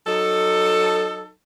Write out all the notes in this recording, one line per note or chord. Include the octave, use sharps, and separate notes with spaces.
F#3 D#4 A4